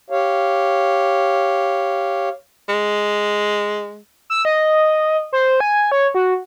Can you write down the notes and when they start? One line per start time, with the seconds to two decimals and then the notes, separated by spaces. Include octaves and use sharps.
0.10 G4 C#5 F5
2.69 G#3
4.30 E6
4.45 D#5
5.33 C5
5.60 G#5
5.92 C#5
6.15 F#4